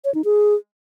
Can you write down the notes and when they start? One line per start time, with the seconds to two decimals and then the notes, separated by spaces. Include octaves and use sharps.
0.05 C#5
0.15 D#4
0.24 G#4